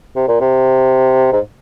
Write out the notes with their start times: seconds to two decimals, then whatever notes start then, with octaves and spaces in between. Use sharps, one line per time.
0.15 C3
0.28 A#2
0.40 C3
1.33 G#2